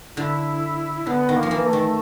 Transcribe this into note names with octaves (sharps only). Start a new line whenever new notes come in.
D3 E4
D3 B3
D#3
A#3
F3
E3
A3
D#3